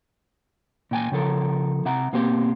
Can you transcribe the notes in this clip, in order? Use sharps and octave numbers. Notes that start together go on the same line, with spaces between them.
A#2 G5 G#5
C#3 F3 A4 A#4
C3 E5 F#5 A#5
B2 A#3 C4 G4 C5